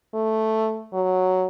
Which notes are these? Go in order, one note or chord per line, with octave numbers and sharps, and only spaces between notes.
A3
F#3